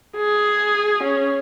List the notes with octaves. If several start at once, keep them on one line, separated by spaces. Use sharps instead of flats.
G#4
C#4